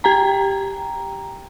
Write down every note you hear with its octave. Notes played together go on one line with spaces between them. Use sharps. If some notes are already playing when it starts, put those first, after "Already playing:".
G4 G5 A#5